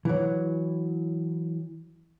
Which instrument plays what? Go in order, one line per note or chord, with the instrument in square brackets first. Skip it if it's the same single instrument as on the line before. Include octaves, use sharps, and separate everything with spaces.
[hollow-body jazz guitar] E3 F#3